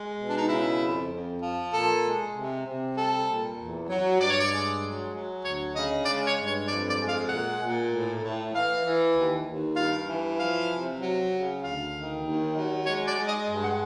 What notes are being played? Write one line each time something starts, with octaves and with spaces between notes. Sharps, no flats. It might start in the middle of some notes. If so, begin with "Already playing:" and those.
Already playing: G#3
B2
D4
D#4
C#3 E4
F2
F2
F3
A#2 A4
G#3
C3
C3
G3 A4
A#2
E2
F#3
G2 D5
C#5
D5
G#3
F#3
F#3
D2 C#5
C#3 D#5
G#3 D5
C#5
G2
C#5
F2 D5
D5
G#3
F5
A#2 F#5
A#2
A2
A2
E3 F5
E3
D#2
D#2
G2 F5
E3
F3 F5
C3
F#3
C#3
D2 F5
D#3
D#2
F#3
G#3 C#5
D5
G#3
D#5
G2
F#5